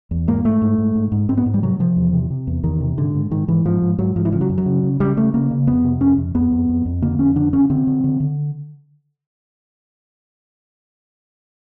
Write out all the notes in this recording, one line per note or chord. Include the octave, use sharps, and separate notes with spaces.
E2
G#2 A#3
G#2 A3
G#2
G#2
G#2
G#2
G#2 C4
B3
G#2
G3
C3 F#3
C3 F3
E2
C3
C3
E2
E2 D#3
C3
G#2 D3
G#2
G#2 D#3
G#2 E3
G#2 F3
G#2
G#2 F#3
G#2 F3
E3
C#3 F3
F#3
F#2
F#3
C#3
C#3
C#3 G3
C#3 A3
C#3 A#3
C#3
F2 B3
C3
F2 C#4
F2
F2 B3
F2
F2
F2
D3 A#3
F2 C#4
D3 D4
D3 C#4
D3 C4
D3
D3
D3